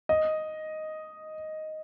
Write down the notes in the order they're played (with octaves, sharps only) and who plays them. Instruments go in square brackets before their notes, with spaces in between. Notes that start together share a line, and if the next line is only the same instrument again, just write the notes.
[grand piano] D#5